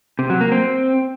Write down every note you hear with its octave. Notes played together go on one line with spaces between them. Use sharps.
C3
F#3
A#3
C4